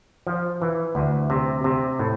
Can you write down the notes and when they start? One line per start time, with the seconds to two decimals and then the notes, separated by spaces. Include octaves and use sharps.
0.27 F3
0.62 E3
0.95 D2
1.30 C3
1.64 C3
1.99 A2